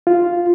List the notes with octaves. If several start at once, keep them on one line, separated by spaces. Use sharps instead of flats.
F4